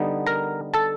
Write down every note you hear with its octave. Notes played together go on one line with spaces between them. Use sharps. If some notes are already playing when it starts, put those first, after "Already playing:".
Already playing: D3 G3 B3 D#4
A#4 A#5
A4 A5